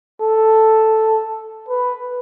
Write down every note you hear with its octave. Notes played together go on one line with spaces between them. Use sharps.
A4
B4